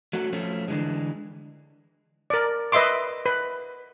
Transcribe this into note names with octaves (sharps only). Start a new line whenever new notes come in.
F#3 A3 C#4 F#4
F3 A3 C#4
D3 E3 G#3
A#4 D5
B4 D#5 E5 C6 D6
B4